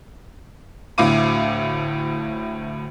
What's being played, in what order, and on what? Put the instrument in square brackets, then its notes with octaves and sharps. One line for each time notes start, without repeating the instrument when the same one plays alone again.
[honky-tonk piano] D2 A2 F5 D6 D#7